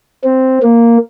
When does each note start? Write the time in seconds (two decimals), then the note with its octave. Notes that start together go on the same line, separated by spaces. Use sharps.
0.24 C4
0.63 A#3